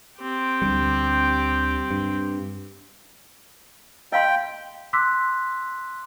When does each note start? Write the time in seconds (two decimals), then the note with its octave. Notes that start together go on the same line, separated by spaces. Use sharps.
0.20 C4 G4
0.62 D2 D3 G3
1.91 G2
4.12 D#5 F5 G5 C6
4.93 C6 D6 E6 F#6 B6